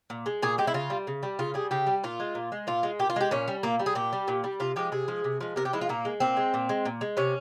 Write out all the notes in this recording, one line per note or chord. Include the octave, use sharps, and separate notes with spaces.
A#2
G#3
A#2 G#4
G#3 G4
E4
C#3 F4
G3
C#3
G3
C#3 F4
G3 G#4
C#3 G4
G3
A#2 F4
G#3
A#2
G#3
A#2 F4
G#3
A#2 G4
F4
G#3 G4
A#2 C#4
G3
A#2 A#3
G3
G#4
A#2 G4
G3
A#2
G3
C3 F4
F3 G#3 G4
C3 G#4
F3 G#3
C3
F3 G#3
C3 A#4
G4
F3 G#3 E4
F4
A#2 A#3
G#3
A#2 C4
G#3
A#2
G#3
A#2
G#3
C3 C#4